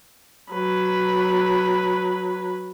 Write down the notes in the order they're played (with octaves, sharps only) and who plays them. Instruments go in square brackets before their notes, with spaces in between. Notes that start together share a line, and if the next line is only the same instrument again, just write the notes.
[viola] F#3 B4